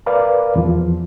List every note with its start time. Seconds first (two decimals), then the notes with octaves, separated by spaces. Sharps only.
0.06 A#4 B4 D5 F5
0.56 E2 F3